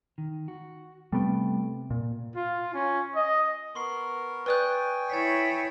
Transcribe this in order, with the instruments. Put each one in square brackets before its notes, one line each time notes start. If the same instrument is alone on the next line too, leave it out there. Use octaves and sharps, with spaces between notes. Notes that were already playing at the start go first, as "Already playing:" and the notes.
[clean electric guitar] D#3
F#4
[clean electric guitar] C3 G5 [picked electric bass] G3 A3 B3
[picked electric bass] A#2
[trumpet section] F4
C#4
D#5
[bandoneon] B3 A#4 [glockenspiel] C6 C#6 C7
[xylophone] B4 D5 F#6 [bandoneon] G5 G#5 [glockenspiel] C#6 D#6 G6
[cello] E4 C#5 [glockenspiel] A6 B6